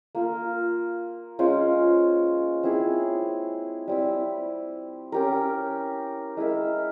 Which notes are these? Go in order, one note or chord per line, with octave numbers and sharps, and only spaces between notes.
A#3 F4 A#4
G#3 C#4 F4 C5
C4 E4 G#4 C#5
G3 C4 E4
C#4 G4 A#4
G#3 E4 A#4 E5